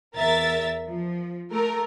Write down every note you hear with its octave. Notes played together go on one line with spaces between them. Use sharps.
E2 A#4 E5 A6
F3
A3 A#4